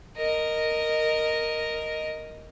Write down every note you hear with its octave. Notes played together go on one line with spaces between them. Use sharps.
A#4 D#5